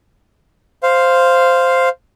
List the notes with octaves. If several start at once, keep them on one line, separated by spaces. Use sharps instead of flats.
C5 F5